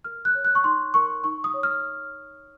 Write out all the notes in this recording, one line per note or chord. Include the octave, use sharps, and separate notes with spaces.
A#4 F6
F#6
C#5
F#6
C#6
D#4 C6
A#4 C#6
D#4 C#6
D#6
C#5
F6